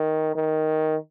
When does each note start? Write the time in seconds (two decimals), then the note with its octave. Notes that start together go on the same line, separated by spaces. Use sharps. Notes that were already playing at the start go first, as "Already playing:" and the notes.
Already playing: D#3
0.35 D#3